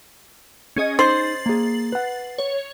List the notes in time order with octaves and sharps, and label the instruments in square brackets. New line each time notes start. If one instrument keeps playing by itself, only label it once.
[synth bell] C#4 G#4 D#5
[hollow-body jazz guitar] D#4 [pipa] C5 [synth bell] A6 C7 F#7
[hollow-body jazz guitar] A#3 G#4
B4 F#5
[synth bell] C#5